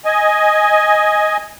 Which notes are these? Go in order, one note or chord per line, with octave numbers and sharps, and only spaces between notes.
D#5 G#5